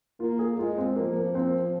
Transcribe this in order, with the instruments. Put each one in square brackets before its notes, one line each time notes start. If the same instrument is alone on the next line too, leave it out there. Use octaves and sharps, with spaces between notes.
[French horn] A#3 [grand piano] F4
[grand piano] G#4
[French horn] G#3 [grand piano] F4
[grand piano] C4
[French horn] F3 [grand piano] A#3
[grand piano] A#3
C4